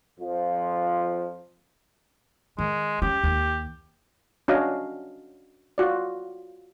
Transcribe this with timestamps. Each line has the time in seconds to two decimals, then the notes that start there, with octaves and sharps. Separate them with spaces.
0.20 F2 F3
2.59 D#3 G#3
3.02 C#4 G4
3.24 D#2
4.48 C#4 D4 F#4 D#5 F5
5.78 F4 F#4 D5